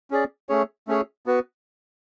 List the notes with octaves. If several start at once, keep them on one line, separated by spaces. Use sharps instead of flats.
C#4 G#4 D5
A3 C#4 G#4 C#5
A3 C#4 G#4 C#5
B3 F#4 B4